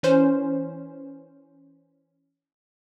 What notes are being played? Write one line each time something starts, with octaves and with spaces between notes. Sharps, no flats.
E3 C#4 C5